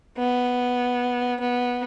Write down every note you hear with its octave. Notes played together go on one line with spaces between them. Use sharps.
B3
B3